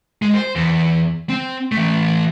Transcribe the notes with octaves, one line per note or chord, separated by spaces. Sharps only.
G#3
C5
E2
C4
E3 A3